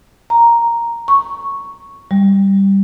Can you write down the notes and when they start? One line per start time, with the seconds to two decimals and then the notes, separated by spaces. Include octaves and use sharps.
0.30 A#5
1.08 C#6
2.11 G3